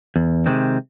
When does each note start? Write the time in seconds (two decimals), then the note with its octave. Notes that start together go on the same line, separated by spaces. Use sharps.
0.16 E2
0.46 C3 D#3 G#3 C4